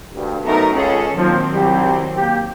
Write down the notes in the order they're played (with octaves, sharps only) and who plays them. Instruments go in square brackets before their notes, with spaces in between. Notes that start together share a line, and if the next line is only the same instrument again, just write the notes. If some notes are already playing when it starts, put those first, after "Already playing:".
[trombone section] D2 G2
[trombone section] F#2 A3 [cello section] B3 D#4 A#4
[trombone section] C#2 [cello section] C#4 G#4 A4
[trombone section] A#2 F3 [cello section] D#3 F#3 C4
[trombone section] C2 G3 G4
A#3 G4